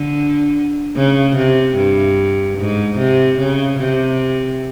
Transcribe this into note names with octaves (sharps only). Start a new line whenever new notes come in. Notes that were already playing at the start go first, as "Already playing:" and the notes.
Already playing: D3
C#3
C3
G2
G#2
C3
C#3
C3